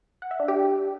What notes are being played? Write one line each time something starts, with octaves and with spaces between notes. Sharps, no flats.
F#5
E5
D4
G4